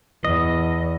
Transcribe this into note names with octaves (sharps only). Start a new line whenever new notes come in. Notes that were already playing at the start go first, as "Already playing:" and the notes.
E2 D#5